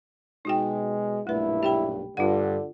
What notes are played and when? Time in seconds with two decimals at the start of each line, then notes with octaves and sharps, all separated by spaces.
0.45 B2 G#3 D#4 F#4 G5
1.27 B1 G2 A#2 A3 E4 B4
1.63 G4 G5 B5
2.17 G2 D3 F4 F#5